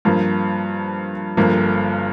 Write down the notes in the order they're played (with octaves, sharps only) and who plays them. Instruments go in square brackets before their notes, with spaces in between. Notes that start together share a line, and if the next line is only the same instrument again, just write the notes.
[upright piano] G2 F3 A#3
G1 G2 F3 A#3